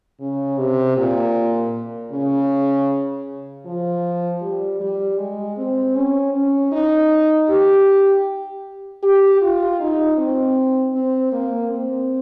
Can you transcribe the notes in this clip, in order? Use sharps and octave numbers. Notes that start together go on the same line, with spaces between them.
C#3
C3
A#2
C#3
F3
G3
G3
G#3
C4
C#4
C#4
D#4
G4
G4
F4
D#4
C4
C4
A#3
C4